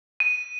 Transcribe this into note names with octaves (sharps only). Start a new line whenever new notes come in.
D#7